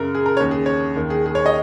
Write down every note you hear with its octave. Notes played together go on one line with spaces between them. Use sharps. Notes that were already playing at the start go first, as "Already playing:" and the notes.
Already playing: F#2 C#3 A#4
G#4
A#4
D#2 C#3 C#5
G#4
C#5
D#2 D#3
G#4
G#4
C#5
D#5